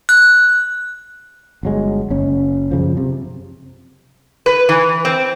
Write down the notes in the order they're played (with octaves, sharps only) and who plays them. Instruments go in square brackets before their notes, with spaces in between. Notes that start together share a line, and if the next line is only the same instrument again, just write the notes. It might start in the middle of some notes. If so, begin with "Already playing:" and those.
[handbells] F#6
[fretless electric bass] G1 F#3 G#3
F#1 C#4
F#2 C#3 F3
C3
[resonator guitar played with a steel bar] B4
E3
C4